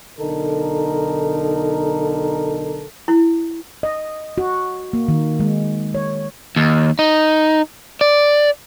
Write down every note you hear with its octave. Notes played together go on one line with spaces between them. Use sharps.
B1 D3 D#4 A4 A#4
E4
D#5
F#4
A#3
D#3
G#3
C#5
D#2
D#4
D5